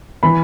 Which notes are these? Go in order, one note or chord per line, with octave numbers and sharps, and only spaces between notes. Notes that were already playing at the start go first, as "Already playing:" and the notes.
E3 B5